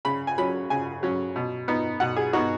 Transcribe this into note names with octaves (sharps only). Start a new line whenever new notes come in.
C#3 B5
G#5
F#3 C#4 B5
C#3 G#5
F#3 C#4
B2
B3 D#4
B2 F#5
G#4
B3 D#4 F#4